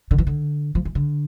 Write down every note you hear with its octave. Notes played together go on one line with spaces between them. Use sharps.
D3
E3
D3
F3
E3
D3